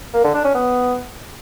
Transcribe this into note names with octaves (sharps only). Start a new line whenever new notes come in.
A#3
D3
D4
C#4
B3